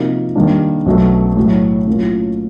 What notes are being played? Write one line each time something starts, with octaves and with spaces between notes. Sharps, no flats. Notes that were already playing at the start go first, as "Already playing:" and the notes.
Already playing: C3 F3 A#3 D#4 F#4
D#2 D#3 G3 A#3 D4
B1 B2 F#3 A3 C#4
A2 F#3 A3
A2 F#3 A#3 C#4 F4